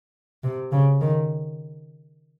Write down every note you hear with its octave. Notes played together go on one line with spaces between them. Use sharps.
C3
C#3
D#3